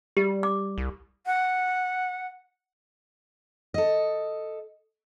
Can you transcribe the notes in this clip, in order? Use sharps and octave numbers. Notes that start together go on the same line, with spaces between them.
G3 G4
D6
C2
F#5
A4 D#5